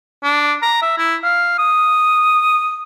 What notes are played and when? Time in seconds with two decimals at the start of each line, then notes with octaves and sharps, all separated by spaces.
0.23 D4
0.63 A#5
0.82 E5
0.98 E4
1.23 F5
1.58 D#6